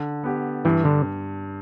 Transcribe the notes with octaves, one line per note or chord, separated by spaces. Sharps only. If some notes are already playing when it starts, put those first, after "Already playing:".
Already playing: D3
B3 G4
G2 E3
D3